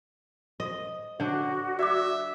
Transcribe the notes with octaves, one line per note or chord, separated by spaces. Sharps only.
D#5
D3 D4 F#4 C#5
D5 E5 D6